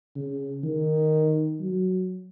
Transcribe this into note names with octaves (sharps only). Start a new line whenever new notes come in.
C#3
D#3
F#3